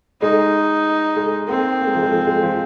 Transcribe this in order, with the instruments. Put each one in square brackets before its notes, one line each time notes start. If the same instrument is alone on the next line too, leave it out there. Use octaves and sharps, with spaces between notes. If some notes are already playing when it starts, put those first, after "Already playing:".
[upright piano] G#3 [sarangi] D#4
[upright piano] G#3
[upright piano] A#3 [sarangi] C4
[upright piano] A#3
G#3
F3
G#3
F3
G#3
F3